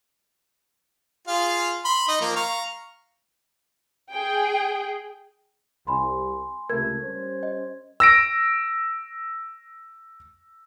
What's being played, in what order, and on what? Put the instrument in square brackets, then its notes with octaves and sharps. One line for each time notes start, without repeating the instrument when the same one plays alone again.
[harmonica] F4 G#4 F5
B5 C6
D#4 D#5
F3 A#3 A#4
F5 A#5 C#6
[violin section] G#4 G5
[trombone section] C2 [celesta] G#5 B5 C6
[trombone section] C#2 C3 A3 [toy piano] A#4 [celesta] G#6
[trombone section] G3 C#4 C5
[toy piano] D#5
[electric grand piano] E6 A#6 D7